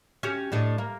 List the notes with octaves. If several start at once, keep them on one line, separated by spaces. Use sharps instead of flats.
C#4 F#4 G4
A2 D4 D#5
A#3